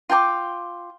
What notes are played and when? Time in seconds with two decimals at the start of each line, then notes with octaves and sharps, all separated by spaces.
0.10 F4 G5 A5 D6